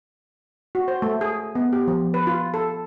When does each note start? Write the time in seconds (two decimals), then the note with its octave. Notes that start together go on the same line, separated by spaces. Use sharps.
0.75 F#4
0.88 C5
1.02 A3
1.21 G#4
1.55 B3
1.73 G4
1.88 F3
2.14 B4
2.27 F4
2.54 A4